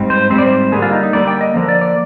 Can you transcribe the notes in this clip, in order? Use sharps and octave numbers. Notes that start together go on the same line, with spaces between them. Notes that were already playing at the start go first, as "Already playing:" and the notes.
Already playing: G#2 G3 C4
C5
G#2 G3 C4 C5
D5
C5
D3 G3 A#3 G#4
F4
D#4
D#4
D3 G3 A#3 D5
G5
D#5
D3 F3 A#3
D5
D5